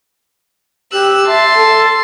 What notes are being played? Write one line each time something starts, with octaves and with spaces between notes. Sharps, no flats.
G4 E6 F#6
E5 A5 C6
A4